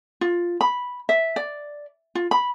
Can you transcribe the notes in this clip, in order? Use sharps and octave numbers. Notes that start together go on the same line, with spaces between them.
F4
B5
E5
D5
F4
B5